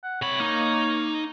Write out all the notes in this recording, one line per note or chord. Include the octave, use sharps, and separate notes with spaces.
F#5
C3 C#5 B5
A#3 D#4